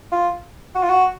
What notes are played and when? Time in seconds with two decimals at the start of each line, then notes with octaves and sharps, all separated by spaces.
0.12 F4
0.75 F#4
0.83 F4
0.89 F#4